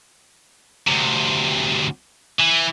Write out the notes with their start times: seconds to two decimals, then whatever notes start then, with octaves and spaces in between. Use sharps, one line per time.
0.87 D2 C3
2.40 E3